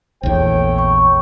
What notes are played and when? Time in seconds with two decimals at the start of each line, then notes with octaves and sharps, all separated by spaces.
0.23 A#1 E2 A3 C#5 G5
0.79 C#6